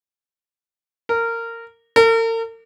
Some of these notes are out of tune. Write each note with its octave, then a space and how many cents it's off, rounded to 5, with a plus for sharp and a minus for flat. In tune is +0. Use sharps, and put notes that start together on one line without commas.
A#4 -20
A#4 -45